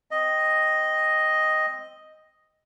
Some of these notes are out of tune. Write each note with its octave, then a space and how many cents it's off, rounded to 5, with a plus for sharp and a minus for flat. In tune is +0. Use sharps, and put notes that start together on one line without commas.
C4 +0 D#5 +0